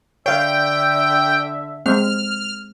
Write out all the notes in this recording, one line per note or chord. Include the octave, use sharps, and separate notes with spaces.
D3 C#5 E5 F5 G5
G#3 C4 F6